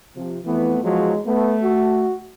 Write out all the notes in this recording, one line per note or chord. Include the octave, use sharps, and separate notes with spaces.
C3 F3
F2 E3 A3 B3
E2 F3 F#3 G#3
A3 B3
F#4